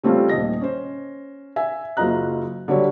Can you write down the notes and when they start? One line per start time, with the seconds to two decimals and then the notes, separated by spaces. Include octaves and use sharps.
0.04 G3 A3 C4 C#4 F4
0.29 D#1 D#5 A#6
0.61 C#4 C5
1.56 E5 G#5
1.97 F#1 F#3 F4 D#5 A#5 F#6
2.68 D3 F#3 G3 C#5